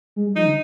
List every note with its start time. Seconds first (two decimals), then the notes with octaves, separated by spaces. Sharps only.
0.16 G#3
0.26 G3
0.36 F3 D#4
0.46 D3